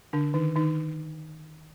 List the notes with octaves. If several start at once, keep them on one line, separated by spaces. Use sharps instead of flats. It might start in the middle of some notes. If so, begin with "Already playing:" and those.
D3 D4
D#3 D#4
D#3 D#4